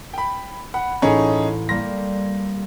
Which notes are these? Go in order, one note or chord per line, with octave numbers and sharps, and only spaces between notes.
G5 B5
F#5 B5
A1 A2 C#4 D#4 G#4
G3 A#3 C6 A#6